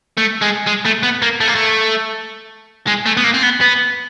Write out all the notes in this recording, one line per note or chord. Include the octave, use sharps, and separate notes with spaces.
A3
G#3
G#3
A3
B3
A#3
A3
A#3
A3
G#3
A3
B3
A#3
C4
B3
B3